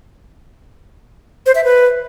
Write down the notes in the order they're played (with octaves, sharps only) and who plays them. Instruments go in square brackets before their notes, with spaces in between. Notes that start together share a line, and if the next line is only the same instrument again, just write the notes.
[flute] C5
E5
B4